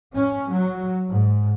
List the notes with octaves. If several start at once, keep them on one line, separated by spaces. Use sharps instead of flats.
C#4
F#3
G#2